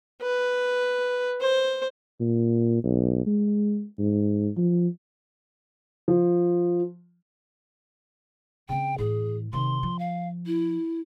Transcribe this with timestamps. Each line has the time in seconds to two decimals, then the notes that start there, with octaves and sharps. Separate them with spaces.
0.22 B4
1.41 C5
2.20 A#2
2.84 B1
3.26 G#3
3.99 G#2
4.57 F3
6.08 F3
8.69 C#3 C4 G5
8.98 A2 E3 G#4
9.53 C3 D#3 C6
9.83 F3
9.99 F5
10.46 E4